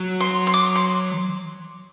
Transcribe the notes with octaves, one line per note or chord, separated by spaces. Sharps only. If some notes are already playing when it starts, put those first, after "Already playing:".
Already playing: F#3
C6
C6
D6
C6